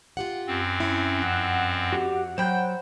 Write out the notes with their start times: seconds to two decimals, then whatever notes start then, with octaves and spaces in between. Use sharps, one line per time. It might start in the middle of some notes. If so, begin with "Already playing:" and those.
0.17 F4 G4 F#5
0.47 F#2 C4
0.80 C#4 E4
1.22 F2 F#5 E6
1.93 F#4 G4
2.38 F#3 C5 G5 B5 G6